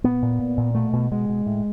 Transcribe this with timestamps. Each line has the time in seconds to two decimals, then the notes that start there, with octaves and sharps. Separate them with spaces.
0.04 A#2 B3
0.22 A#2
0.39 A#2
0.57 A#2
0.75 B2 A3
0.93 B2
1.12 B2 G#3
1.29 B2
1.46 A2